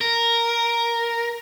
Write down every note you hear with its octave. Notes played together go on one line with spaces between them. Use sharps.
A#4